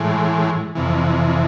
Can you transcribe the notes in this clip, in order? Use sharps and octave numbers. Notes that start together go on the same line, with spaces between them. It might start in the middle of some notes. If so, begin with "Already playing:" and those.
Already playing: A2 E3 G#3
F2 C3 E3